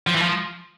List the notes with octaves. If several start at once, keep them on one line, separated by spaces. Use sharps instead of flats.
F3
E3
F3